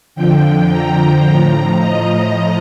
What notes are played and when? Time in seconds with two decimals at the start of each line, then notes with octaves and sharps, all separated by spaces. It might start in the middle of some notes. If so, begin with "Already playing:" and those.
0.15 F2 D3 F3 G5
0.70 A#5
1.24 A2 A#5
1.29 F3
1.79 D#5